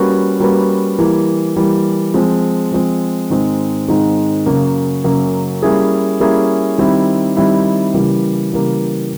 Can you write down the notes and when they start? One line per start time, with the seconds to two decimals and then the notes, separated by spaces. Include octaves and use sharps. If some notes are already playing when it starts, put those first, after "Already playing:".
Already playing: G3 A#3 C#4 F#4 B4
0.40 G3 A#3 C#4 F#4 B4
0.98 E3 G3 A#3
1.56 E3 G3 A#3
2.14 F3 G#3 C4
2.72 F3 G#3 C4
3.30 G#2 D#3 G#3 C4
3.88 G#2 D#3 G#3 C4
4.46 F#2 C#3 F#3 A#3
5.04 F#2 C#3 F#3 A#3
5.62 G3 A#3 C#4 E4 G#4
6.20 G3 A#3 C#4 E4 G#4
6.78 D#3 G3 C4 E4
7.37 D#3 G3 C4 E4
7.94 C#3 E3 G3 A#3
8.52 C#3 E3 G3 A#3